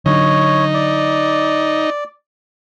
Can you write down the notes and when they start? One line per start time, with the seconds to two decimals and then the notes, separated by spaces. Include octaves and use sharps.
0.06 D3 F#3 D#4 C#5
0.74 D5